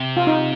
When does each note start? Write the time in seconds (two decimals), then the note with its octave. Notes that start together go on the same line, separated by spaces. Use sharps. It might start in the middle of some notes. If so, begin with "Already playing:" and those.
Already playing: C3
0.17 F4
0.27 D#4